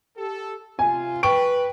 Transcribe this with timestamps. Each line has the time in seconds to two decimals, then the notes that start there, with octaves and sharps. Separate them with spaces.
0.16 G4 A4
0.79 C3 F4 G#5
1.23 B4 G5 C#6 D7